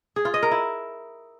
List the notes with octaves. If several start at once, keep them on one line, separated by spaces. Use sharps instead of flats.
G#4
F4
D#5
A#4
E4